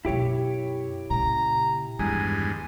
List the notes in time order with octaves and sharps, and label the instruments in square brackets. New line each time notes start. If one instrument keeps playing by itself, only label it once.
[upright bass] F#2 B2 [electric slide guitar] E4 G4 C#5
[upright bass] A#2 C#3 [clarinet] A#5
[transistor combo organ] E2 G2 G#3 [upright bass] D#3 [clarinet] G#5